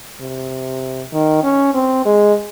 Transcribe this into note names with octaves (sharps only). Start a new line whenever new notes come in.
C3
D#3
C#4
C4
G#3